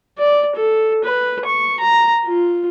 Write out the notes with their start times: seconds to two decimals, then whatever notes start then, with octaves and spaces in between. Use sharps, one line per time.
0.18 D5
0.56 A4
1.04 B4
1.45 C#6
1.80 A#5
2.26 F4